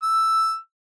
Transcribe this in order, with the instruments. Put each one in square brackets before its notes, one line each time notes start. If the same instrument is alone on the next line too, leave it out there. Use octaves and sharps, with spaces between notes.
[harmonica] E6